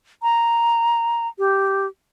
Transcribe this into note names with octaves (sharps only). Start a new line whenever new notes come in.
A#5
G4